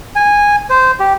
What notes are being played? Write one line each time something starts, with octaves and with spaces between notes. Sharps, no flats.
G#5
C5
G4